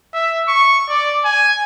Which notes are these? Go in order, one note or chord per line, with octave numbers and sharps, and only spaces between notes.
E5
C#6
D5
G#5